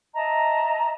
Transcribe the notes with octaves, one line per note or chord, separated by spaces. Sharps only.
D#5 E5 A5 A#5